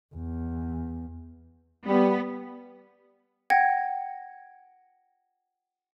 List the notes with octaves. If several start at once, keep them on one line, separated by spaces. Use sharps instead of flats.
E2
G3 B3
F#5 G5 G#6 A#6